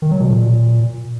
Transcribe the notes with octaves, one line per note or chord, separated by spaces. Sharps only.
D#3
F#3
B2
A#2